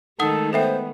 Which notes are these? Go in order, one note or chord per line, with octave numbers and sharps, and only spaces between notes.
D#3 G#3 A3 D#4 A4 F#5 D#6
B3 A4 C5 E5 G5